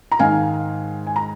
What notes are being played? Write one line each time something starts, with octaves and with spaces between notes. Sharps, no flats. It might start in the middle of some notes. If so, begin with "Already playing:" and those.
A#5
G#2 D#3 F5 G#5
G#5
A#5